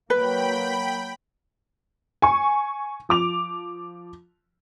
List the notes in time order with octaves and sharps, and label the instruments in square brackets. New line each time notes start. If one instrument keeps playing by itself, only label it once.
[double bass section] F#3 A#3 [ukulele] B4 [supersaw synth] G5 B5
[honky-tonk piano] G#5 C#6
F3 D6 F7